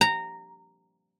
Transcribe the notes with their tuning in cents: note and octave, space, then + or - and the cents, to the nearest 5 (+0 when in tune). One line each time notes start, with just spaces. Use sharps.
A#5 -15